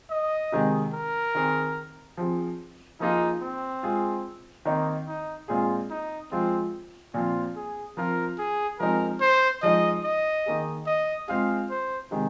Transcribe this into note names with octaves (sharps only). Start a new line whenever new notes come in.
D#5
C3 D#3 G#3
A#4
D#3 C4 G#4
F3 C4 G#4
F3 A#3 D#4 F4 G#4
C4
G#3 F4 G#4
D#3 A#3 C4 D#4
D#4
A#2 G#3 C4 F4 G#4
D#4
F3 G#3 C4 F4
A#2 F3 C4 F4
G#4
F3 C4 F4 A#4
G#4
F3 G#3 C4 D#4 G#4 A#4
C5
F3 G#3 D#4 D#5
D#5
D#3 A#3 G#4
D#5
G#3 C4 F4 G#4 F5
C5
C3 D#3 G#3